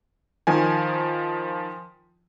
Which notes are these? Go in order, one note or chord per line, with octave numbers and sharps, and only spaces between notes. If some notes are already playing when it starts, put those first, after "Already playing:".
D#3 F3 G#5